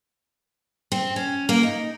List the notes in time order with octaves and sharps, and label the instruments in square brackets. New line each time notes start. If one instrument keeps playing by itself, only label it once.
[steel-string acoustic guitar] C4
C#4
A#3
D#4